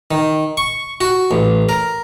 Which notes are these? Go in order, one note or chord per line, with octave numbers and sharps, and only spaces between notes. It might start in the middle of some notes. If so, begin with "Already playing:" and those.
D#3
C#6
F#4
A1
A#4